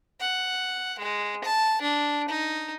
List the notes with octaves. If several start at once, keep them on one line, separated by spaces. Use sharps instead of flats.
F#5
G#3
A5
D4
D#4